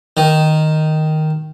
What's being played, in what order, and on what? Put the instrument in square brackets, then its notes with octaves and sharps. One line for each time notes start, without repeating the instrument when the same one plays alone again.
[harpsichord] D#3